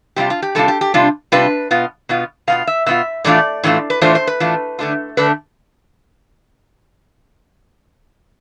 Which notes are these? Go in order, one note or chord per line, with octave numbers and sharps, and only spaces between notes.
C3 G3 D4 F4 G4
F4
G4
C3 G3 D4 F4 A4
G4
G4
C3 G3 D4 F4
C3 G3 D4 F4 B4
B2 B3 F4
B2 B3 F4
B2 B3 F4 F5
E5
B2 B3 F4 E5
A2 E3 A3 D4 F4 D5
A2 E3 A3 D4 F4
B4
A2 E3 A3 D4 F4 C5
C5
B4
A2 E3 A3 D4 F4
D3 A3 D4 F4
D3 A3 D4 B4